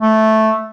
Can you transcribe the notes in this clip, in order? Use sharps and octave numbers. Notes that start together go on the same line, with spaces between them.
A3